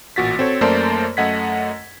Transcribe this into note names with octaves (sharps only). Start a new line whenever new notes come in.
A1 A#2 F#4 A6 B6
C4 F#4 A4 C#5
F#2 A3 A#3 C5 D5 A5
F#2 A3 D#5 F#5 G#6 B6